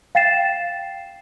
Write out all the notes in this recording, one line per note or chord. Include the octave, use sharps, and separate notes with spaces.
F5 G5 A6 C7 E7